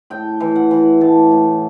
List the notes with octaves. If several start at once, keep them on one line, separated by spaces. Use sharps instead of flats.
A2 G5
E3
F#5
E3
A2 A5
A2